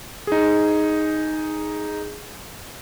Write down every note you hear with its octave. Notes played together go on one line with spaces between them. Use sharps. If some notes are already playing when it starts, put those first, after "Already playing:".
D#4 G#4